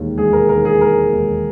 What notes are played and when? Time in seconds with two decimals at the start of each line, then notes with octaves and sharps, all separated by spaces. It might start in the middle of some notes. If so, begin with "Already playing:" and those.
Already playing: E1 D#2 D#3 G#3
0.18 E1 G#4
0.33 A#4
0.49 D#3 A#4
0.65 G#4
0.81 G#3 A#4
1.13 D#2